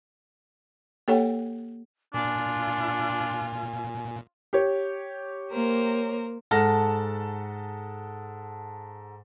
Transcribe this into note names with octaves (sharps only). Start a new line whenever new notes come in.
A#3 G4 A4 C#5 F#5 G5
A#2 D4 F4 G#5
G4 C#5
A#3 A#4 C5
G#2 A4 F#5 A5 F6 A#6